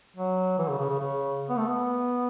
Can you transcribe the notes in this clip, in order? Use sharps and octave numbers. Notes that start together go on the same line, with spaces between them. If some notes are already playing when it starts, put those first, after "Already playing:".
F#3
E3
C#3
C#3
C#3
C#3
B3
A3
B3